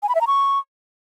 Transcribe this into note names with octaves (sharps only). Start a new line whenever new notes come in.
G#5
B5
E5
A#5
C#6